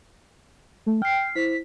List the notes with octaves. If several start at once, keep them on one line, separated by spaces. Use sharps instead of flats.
A3
G5 F6 C7
E4 C5 B6